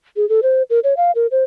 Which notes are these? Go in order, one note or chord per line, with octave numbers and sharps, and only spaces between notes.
G#4
A4
C5
A#4
C#5
F5
A#4
C5